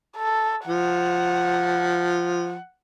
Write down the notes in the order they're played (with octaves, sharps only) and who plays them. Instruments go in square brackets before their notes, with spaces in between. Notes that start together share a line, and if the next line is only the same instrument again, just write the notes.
[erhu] A4
[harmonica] F3 [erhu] F#5